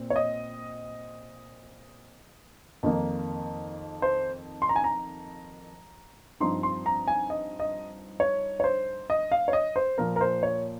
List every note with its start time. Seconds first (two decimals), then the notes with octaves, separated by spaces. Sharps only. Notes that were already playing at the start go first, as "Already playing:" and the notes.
Already playing: A#2 C4
0.10 C#5
0.16 D#5
2.83 F2 D#3 A#3 D#4
4.02 C5
4.62 C6
4.69 A#5
4.76 G#5
4.84 A#5
6.40 G2 F3 C4 D#4 C6
6.63 C6
6.86 A#5
7.08 G#5
7.30 D#5
7.60 D#5
8.20 C#5
8.60 C#5
8.64 C5
9.10 D#5
9.32 F5
9.48 C#5
9.53 D#5
9.76 C5
9.98 A#2 F3 A#3 A#4
10.16 A#4
10.21 C5
10.43 C#5